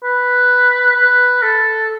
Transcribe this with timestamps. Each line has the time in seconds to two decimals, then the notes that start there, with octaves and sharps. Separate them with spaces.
0.04 B4
0.96 B4
1.42 A4